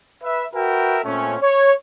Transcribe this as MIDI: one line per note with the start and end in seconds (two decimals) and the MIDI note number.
0.23 0.44 71
0.23 0.44 76
0.54 0.99 66
0.54 0.99 70
0.54 0.99 71
0.54 0.99 76
0.54 0.99 79
1.04 1.36 46
1.04 1.36 57
1.04 1.36 60
1.04 1.36 61
1.41 1.72 73